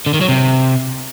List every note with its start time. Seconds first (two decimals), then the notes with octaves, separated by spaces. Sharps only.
0.06 D3
0.14 D#3
0.21 F#3
0.29 C3